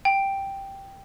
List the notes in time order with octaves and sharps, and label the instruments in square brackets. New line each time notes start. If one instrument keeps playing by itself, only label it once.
[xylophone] G5